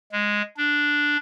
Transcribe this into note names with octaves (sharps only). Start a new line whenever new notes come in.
G#3
D4